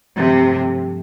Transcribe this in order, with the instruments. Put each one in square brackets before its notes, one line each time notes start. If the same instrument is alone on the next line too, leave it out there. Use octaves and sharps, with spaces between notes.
[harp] G2 F3 A3 [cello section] C3